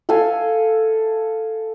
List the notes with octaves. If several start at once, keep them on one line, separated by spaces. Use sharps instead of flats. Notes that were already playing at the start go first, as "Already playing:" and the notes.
A4 E5 F5 G#5